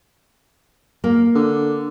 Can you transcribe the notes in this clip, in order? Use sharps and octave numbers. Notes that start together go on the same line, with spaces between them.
A#3
D3